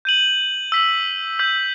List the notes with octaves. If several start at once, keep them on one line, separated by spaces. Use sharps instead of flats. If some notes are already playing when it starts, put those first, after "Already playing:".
G6 D#7 F#7
E6 B6 F#7
E6 G6 B6 F#7